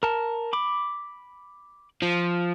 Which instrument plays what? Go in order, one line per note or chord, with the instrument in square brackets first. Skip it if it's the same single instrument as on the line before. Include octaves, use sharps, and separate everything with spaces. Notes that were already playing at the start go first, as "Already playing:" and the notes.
[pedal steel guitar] A#4 A5
B5 D6
[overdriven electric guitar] F3